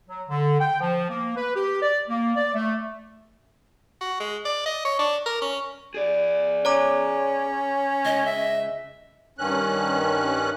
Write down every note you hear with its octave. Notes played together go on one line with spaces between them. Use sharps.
F#3
D3
G5
F3
A#3
B4
G4
D5
A#3
D5
A3
F#4
G#3
D5
D#5
C#5
D4
A#4
C#4
G#4 D5
C#4 C#5 A#5 D6
C#2 D#5
E5
G2 D#3 C#4 F#6